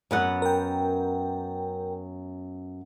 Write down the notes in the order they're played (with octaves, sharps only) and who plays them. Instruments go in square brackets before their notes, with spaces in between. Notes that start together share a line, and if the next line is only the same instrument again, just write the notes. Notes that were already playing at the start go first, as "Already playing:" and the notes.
[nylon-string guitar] F#2 B3 F#5
[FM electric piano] A#4 G5